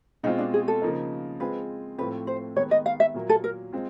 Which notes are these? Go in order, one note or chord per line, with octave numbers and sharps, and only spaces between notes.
B2 G#3 C4 D#4 F4
D4
G#4
A4
C#3 F3 A#3 D#4
G#3 C4 F4 G#4 B4
A2 F3 A3 C4 B4
C5
D#3 G#3 B3 C#5
D#5
F5
E5
A#2 F#3 A#3
A4
A#4
G#3 C4 F4